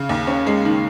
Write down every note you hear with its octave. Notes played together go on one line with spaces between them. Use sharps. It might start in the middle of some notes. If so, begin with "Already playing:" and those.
Already playing: C#3
D#2
C#4
G#3
D#3